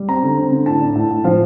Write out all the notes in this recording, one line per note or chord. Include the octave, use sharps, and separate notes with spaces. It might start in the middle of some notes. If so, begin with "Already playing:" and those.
Already playing: G3
C4 A#5
D3
C4
D3
A2 A5
D4
A2
A2
F3 F5